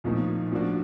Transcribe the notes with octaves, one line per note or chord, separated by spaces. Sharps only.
A#1 A2 F3 A#3 D#4
A2 F3 A#3 D4 F#4